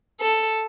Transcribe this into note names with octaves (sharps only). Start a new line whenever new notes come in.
A4